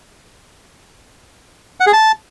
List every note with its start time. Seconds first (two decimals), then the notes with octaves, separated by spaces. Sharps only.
1.80 F#5
1.87 G#4
1.93 A5